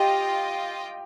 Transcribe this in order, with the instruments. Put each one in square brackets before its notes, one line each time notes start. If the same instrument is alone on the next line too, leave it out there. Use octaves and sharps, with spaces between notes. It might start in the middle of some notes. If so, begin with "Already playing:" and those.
Already playing: [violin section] F4 D#5 G5 [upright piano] G4